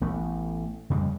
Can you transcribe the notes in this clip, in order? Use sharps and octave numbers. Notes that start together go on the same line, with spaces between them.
A1 A3 B3
F2 C#3 G3 G#3